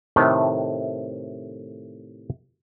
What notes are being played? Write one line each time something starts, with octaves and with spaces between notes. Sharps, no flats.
A2 C3 D#3 A3